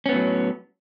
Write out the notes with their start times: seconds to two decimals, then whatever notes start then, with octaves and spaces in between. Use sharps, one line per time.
0.06 C#4
0.09 B3
0.12 A2
0.15 F#3